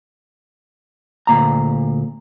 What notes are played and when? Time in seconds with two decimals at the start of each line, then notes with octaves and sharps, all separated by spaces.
1.27 D2 A#2 A#5